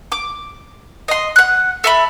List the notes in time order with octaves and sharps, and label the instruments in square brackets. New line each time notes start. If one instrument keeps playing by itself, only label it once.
[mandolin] D6
D#5 C6
F#5 F#6
A4 E5 B5